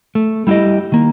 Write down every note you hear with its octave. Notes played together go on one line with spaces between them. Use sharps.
A3
G3 E4 F4 G4 D#5
D#3 A#3